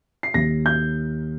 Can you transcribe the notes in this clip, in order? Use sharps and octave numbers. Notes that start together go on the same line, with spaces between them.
C7
D#2 D#3 A#6
G6